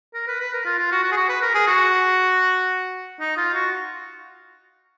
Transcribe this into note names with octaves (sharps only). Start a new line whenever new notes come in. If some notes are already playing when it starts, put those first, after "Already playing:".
A#4
B4
B4
A#4
F4
F4
F#4
F#4
G#4
F#4
B4
A#4
G#4
F#4
D#4
F4
F#4